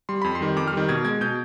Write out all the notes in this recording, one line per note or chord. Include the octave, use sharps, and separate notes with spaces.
G3 C6
F2 B5
C6
D#3 G3
F2 D6
F6
D#3 G3
B2 G#6
G#3 G#6
B2 G6